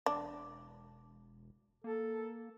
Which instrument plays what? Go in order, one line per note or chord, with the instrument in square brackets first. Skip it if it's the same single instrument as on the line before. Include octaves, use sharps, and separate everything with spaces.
[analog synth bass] E1 [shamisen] D4
[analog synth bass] A#3 [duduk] A4